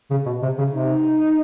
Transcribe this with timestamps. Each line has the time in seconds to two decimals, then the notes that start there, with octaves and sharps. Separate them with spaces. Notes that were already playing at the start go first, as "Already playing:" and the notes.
0.11 C#3
0.26 B2
0.42 C3
0.58 C#3
0.73 C3 D#4